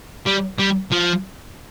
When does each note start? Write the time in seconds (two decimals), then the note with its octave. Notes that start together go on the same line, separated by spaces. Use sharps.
0.26 G3
0.59 G3
0.92 F3